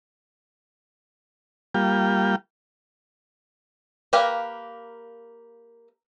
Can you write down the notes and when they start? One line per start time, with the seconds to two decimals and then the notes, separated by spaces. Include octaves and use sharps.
1.74 G3 A#3 F4 G5
4.13 A#3 G4 A#4 B4 F5